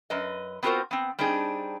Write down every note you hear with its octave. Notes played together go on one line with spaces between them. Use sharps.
F#2 B4 D#5
B3 C4 F4 F#4 A#4 C5
B3 C4
G3 C4 D4 D#4 G#4